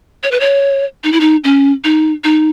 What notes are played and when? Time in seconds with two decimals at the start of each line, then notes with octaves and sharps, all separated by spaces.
0.23 C#5
0.31 B4
0.40 C#5
1.04 D#4
1.12 E4
1.20 D#4
1.44 C#4
1.84 D#4
2.24 D#4